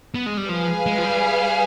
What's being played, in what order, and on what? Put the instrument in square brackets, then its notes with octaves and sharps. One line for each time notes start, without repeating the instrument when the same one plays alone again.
[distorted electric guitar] B3
G#3
G3
[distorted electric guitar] F3 [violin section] G#4 B4 F5 G#5
[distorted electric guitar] G#3
F3
G3